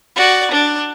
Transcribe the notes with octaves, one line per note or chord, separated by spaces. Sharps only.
F#4 D5
D4